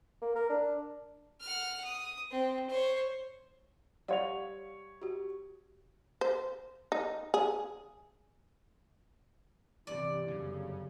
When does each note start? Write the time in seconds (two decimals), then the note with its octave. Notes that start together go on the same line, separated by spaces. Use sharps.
0.22 A#3
0.35 A#4
0.49 D4
1.41 F#5 F6
1.85 D#6
2.31 C4
2.70 C5 C#5
4.08 G3 C#5 D5 F5 F#5 F7
5.02 F#4 G4
6.21 C5
6.92 D#4
7.34 G#4
9.87 G2 C3 E3 D5
10.28 G1 F#2 C#3